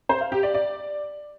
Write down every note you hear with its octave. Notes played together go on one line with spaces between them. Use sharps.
C5
F5
G4
D5
D5